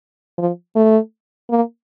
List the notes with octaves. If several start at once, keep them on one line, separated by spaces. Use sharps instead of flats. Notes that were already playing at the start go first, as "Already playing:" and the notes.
F3
A3
A#3